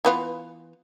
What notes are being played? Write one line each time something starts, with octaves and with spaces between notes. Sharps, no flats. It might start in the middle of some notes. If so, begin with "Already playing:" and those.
E3 B3 F4